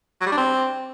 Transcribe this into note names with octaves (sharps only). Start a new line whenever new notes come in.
F#3
G3
D4
C4